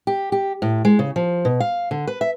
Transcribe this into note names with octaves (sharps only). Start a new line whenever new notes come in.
G4
G4
A2
G#3
C#3
F3
B2
F5
D3
B4
E5